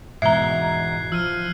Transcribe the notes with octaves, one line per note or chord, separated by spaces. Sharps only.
G#2 B2 E3 E5 A#5 F#6 G#6 C7
F3 E6 F6 D#7